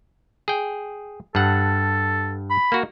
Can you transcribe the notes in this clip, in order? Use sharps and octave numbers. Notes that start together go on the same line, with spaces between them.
G#4 G5
G2 A4 F#5
B5
A#3 F#4